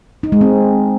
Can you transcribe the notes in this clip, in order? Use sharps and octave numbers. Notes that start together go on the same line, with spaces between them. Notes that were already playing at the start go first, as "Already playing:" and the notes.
D#4
G#3
C4